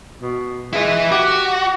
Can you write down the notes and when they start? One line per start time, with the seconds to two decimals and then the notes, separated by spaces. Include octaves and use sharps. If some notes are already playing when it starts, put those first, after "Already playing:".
0.22 B2
0.73 G#3 E4 B4
1.11 F#4 G4